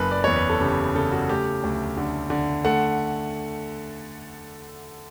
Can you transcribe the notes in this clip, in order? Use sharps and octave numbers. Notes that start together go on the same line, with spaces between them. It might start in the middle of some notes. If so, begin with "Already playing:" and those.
Already playing: F#1 B4
D5
E2 C#5
B4
A4
C#3 G4
G4
C#3 A4
F#4
A3 G4
D2
D3
D3
A3 F#5